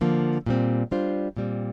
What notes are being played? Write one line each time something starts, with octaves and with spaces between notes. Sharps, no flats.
D3 F3 A#3
A#2 G3 C4
G3 D4 F4 C5
A#2 G3 C4